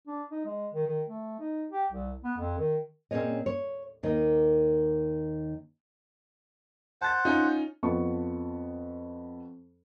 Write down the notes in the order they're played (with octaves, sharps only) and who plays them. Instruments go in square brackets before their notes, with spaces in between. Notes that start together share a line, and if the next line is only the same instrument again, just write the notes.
[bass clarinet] D4
D#4
G#3
D#3
D#3
A3
D#4
G4
C2
B3
F2
D#3
[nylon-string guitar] A#2 C4 C#4 G#4 C#5 D#5
C#5
D#2 D#3 A#3 D#5
[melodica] C5 F#5 [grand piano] A5 A6
[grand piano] C#4 D#4 F4
[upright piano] F2 B3 F4 A5 C#6